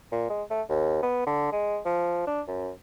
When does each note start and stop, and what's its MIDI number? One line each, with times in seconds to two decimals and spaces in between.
0.12 0.28 46
0.30 0.43 56
0.50 0.62 57
0.69 1.01 39
1.03 1.24 59
1.26 1.52 50
1.52 1.78 56
1.85 2.24 53
2.27 2.41 62
2.48 2.70 42